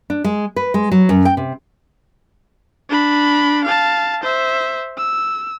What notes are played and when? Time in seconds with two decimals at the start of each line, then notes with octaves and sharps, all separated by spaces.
0.10 D4
0.24 G#3
0.56 B4
0.74 G#3
0.92 F#3
1.09 F#2
1.25 G5
1.37 C3
2.89 D4 B5
3.64 F5 A5
4.23 C5 E5
4.97 E6